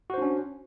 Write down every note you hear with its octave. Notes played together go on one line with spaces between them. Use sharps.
C#4 D4 F#4 C5